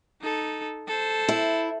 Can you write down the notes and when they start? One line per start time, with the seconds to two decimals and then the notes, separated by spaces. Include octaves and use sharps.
0.21 D#4 A4
0.87 A4 C5
1.28 E4